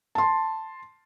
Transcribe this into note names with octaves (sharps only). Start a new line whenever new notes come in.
A5 C6